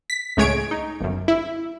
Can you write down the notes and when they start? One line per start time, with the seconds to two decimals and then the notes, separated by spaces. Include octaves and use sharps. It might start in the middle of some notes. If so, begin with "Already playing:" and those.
0.10 B6
0.37 C#2 A2 G#3 C#5 G#6 D7
0.71 D#4
1.01 G1 F#2
1.28 E4